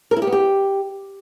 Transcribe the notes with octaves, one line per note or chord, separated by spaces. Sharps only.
A#4
E4
G4
B3
G4